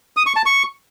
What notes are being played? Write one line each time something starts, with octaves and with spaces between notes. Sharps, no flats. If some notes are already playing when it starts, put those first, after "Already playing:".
D#6
C#6
A5
C#6